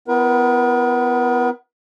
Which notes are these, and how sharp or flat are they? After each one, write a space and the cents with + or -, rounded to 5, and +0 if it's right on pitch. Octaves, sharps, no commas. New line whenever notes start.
B3 +20 E4 +30 A#4 +45